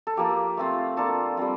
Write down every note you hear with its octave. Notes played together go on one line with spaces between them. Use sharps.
A4
F3 A#3 F4 G4
A3 C4 F4
A#3 D4 F4 A4
G3 C4 F4